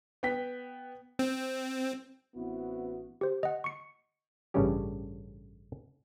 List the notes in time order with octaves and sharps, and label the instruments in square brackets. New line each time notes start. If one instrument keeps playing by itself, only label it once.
[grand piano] B3 G5 B6
[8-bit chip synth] C4
[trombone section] A1 B3 C4 E4 F#4 B4
[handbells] G4 C5
D#5 F#5
C#6 C#7
[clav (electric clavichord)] A1 G2 C#3 G3 C#4 G4